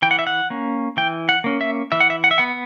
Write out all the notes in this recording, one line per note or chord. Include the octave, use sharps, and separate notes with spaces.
E3 G5
F#5
E5
F#5
A#3 C#4
E3 G5
F#5
A#3 C#4
E5
E3 E5
F#5
E5
F#5
E5
B3 F#5